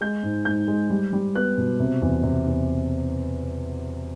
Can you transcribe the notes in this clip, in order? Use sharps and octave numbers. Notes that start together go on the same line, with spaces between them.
G#3 G6
G#2
G#2 G6
G#3
G3
G3
B3 F#6
B2
C3
E2
C3
E2